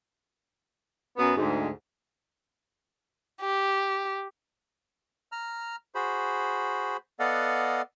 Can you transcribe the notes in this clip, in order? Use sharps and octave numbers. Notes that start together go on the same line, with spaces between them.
F#2 B3
D2 G#2
G4
A#5 F6
F#4 G#4 C5 B5
B3 A4 D5 D#5 F5 F#5